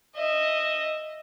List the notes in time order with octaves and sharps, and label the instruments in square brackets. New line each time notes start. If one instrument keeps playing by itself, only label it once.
[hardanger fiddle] D#5 E5